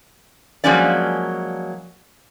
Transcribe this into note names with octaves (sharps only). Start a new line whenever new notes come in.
F3 F#3 G#3 A#3 C#4 D5